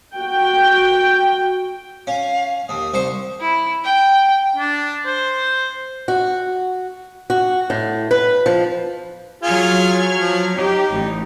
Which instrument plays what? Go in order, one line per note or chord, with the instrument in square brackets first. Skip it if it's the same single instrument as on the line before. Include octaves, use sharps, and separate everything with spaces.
[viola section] F#4 G5
[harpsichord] C#4 [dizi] F5
[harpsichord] D#2 [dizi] D#6
[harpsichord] C2 C5 C#6
[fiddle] E4
G5
[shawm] D4
C5
[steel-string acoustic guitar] F#4
F#4
A2
B4
F3
[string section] F#3 F6 G#6 [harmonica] F4 G#4
[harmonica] F3
[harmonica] D#4 [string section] G4
[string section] A1